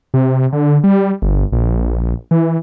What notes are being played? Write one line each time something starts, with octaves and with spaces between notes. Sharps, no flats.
C3
D3
G3
G1
A#1
E3